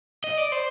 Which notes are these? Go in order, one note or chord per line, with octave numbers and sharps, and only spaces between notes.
D#5
D5
C5